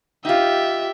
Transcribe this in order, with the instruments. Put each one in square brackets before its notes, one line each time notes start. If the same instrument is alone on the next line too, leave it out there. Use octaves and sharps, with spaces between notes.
[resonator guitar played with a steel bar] D#4 F4 [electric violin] G4 E5